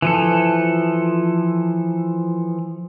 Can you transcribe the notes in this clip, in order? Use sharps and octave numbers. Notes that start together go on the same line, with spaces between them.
E3 F3 A4